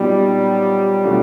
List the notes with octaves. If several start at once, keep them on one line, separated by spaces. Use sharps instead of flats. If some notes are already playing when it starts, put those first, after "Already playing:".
Already playing: A#2 F#3 G3 B3 D#4
B2 F#3 A3 D4 F4